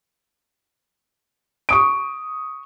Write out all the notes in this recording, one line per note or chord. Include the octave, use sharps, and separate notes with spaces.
C#6 D#6 D7